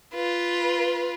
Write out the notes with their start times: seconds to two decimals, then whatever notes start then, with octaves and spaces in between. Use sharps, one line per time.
0.14 F4 B4